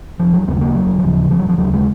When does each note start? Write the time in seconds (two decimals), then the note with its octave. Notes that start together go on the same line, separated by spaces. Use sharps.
0.19 F1 F3
0.34 F#3
0.48 D#2 C#3 B3
0.56 G#3
0.61 A#3
0.75 F1 F#3
0.98 D#3
1.03 D#2 C#3 F3
1.31 F1 F3
1.39 F#3
1.49 F3
1.58 D#2 C#3 F#3
1.73 G#3